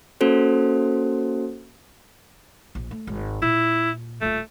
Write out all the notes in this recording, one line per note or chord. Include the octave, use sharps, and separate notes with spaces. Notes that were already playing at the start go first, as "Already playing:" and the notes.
A#3 C#4 F#4 A4 C5
A#1
A3
G#1
A#2 E4
D#1 A3 F4